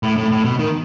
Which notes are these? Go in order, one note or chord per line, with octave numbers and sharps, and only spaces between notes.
A2
A2
A2
B2
D#3